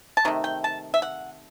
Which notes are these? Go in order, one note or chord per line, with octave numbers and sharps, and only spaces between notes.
A5
C3 D#3 A3
G5
A5
E5
F#5